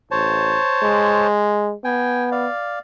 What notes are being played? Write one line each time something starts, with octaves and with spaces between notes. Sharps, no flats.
A1 C5 C#5 A5
G#3
B3 G5 G#5
D5 F5